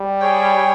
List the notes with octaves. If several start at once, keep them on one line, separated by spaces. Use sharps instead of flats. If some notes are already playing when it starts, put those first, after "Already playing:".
Already playing: G3
G#4 C#5 G5